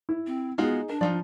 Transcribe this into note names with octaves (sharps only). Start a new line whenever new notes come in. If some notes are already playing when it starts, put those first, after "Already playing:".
E4
C4
G#3 B3 D#4 F4 F#4 G#4
D4 A#4
F3 D#4 F4 D5